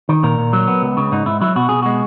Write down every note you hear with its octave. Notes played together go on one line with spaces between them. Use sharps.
D#3
A#2 A#4
A#2
F#3
B3
C#2
C#3
G#2 D#4
G#2 E4
F#3 E4
B2 F#4
B2 G#4
G#3 F#4